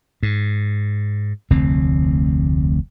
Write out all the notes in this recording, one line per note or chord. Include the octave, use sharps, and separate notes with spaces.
G#2
F1 D2 C4